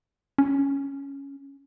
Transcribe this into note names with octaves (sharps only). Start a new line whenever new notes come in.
C#4